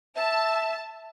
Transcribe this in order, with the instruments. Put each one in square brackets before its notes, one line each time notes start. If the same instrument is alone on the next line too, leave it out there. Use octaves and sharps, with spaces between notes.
[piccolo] E5 [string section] A5